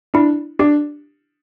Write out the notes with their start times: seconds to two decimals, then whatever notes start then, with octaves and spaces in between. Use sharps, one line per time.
0.14 D4 E4
0.59 D4 G4